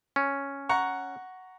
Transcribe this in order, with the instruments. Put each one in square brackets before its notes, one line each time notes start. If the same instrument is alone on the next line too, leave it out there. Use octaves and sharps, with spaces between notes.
[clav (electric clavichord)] C#4
[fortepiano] F#5 A#5 C#6